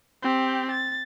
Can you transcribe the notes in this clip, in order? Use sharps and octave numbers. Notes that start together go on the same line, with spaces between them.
C4 G4
A6